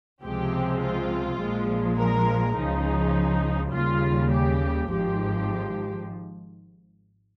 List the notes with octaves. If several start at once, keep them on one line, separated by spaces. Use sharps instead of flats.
C#2 C3 F3 G#3 C4 G4
F4
A#1 A#2 F3 G#3
A#4
C#2 C#3 F3 D#4
D#2 C#3 G3 F4
G4
G#1 G#2 F3 G4